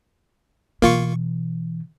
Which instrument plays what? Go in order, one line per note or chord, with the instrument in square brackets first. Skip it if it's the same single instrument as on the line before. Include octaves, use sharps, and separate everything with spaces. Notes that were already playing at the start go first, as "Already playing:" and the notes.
[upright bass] B2 E3 [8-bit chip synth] A#3 F4 C#6